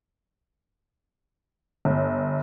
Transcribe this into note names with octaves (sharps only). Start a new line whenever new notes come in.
G1